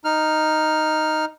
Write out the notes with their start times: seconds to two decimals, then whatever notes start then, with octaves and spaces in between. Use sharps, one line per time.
0.04 D#4 F6